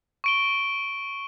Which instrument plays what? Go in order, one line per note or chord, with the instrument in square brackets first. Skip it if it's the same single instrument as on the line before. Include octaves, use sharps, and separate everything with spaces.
[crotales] C#6 D7 G7